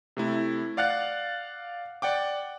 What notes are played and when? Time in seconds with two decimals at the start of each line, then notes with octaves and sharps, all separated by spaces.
0.17 C3 A3 E4
0.77 D5 F5 F#5 F#6 A6
2.02 D5 F#5 G5 D6